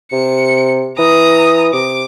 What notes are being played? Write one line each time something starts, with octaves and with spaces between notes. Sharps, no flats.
C3 C#7
E3 A#5 D#6
C3 D6